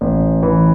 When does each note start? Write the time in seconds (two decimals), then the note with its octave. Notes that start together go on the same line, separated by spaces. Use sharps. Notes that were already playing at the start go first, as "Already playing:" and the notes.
0.01 A1
0.43 E3